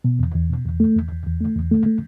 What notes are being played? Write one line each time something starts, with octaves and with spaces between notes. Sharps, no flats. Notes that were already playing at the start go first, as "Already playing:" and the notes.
B2
E2
E2
B2
E2
A3
E2
E2
E2
A3
E2
A3
A3